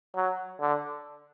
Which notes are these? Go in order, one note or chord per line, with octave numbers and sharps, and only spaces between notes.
F#3
D3